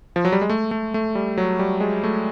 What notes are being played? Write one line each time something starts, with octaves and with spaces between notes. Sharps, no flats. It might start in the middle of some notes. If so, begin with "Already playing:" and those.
F3
F#3
G3
G#3
A3
A3
A3
G3
F#3
G3
G#3
A3